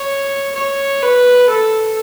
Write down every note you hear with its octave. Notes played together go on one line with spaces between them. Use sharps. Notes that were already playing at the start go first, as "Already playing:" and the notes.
Already playing: C#5
C#5
B4
A4